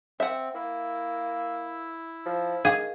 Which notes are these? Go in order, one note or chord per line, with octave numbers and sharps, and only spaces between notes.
C4 E5 F#5
A#3 E4
F3
D#3 G#4 F5